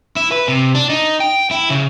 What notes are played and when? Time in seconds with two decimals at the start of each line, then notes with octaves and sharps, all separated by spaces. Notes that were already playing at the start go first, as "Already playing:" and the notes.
0.16 E4
0.32 B4
0.48 C3
0.75 D4
0.90 D#4
1.20 G5
1.51 E4
1.70 C#3